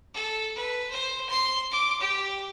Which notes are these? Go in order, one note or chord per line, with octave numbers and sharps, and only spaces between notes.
A4
B4
C5
C6
D6
G4